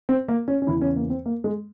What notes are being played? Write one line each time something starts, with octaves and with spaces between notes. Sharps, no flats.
C4
A#3
C#4
C#4
E2 C#3 E3 E4
C#4
A#3
C4
A#3
G#3